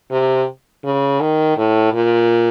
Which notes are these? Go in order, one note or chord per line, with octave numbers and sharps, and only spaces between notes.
C3
C#3
D#3
A2
A#2